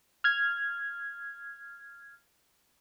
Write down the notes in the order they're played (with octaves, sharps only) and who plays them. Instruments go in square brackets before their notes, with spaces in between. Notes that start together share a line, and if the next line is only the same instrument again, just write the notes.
[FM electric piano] F6 G#6